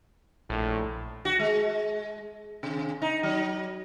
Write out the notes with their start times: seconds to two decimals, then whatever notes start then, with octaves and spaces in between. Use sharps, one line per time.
0.50 A#1 A2
1.25 F#4
1.39 G#3
2.63 C3
3.02 D#4
3.23 F#3